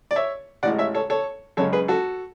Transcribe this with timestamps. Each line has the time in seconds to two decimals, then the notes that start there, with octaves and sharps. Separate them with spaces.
0.11 D5
0.16 C#5 E5
0.63 A1 D5 F#5
0.66 A2 G#3
0.78 C#5 E5
0.95 A4 C#5
1.10 A4 C#5
1.57 F#2 C#3 G#3 C#4 A4 C#5
1.73 G#4 B4
1.88 F#4 A4